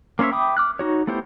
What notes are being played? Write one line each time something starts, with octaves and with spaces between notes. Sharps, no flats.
A#3 C#4 C5 C#5 E5
E5 G5 B5 D6 D#6
D6 F6 F#6
D#4 F#4 C#5
A3 B3 E4 G4 C5